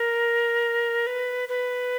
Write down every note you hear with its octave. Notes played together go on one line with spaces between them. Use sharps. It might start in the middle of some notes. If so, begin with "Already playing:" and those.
Already playing: A#4
B4
B4